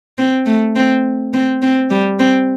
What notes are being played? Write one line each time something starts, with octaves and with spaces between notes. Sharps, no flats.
C4
A3
C4
C4
C4
G3
C4